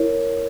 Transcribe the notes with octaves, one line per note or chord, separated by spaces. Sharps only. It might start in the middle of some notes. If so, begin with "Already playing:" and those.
Already playing: E4 A#4 C#5